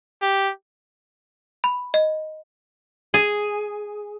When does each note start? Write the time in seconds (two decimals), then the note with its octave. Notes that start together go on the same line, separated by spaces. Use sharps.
0.22 G4
1.64 B5
1.94 D#5
3.14 G#4